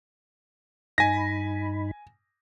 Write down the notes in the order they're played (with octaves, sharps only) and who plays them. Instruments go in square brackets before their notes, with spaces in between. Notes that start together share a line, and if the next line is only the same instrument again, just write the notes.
[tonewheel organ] G2 D#4 B5 [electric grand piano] G#5 A#6